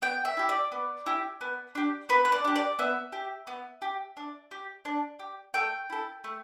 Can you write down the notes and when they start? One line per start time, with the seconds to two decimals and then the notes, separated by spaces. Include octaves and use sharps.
0.02 B3 G5
0.25 E5
0.37 E4 G4
0.49 D5
0.72 B3
1.06 E4 G4
1.41 B3
1.75 D4 G4
2.09 B3 B4
2.25 B4
2.32 D5
2.45 D4 G4
2.56 D5
2.79 B3 E5
3.12 G4
3.47 B3
3.82 G4
4.17 D4
4.51 G4
4.85 D4
5.19 G4
5.54 A3 G5
5.90 E4 A4
6.24 A3